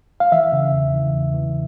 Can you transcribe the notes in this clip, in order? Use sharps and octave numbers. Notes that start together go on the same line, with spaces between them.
F5
E3 E5
C#3
E2
E3
E2
E3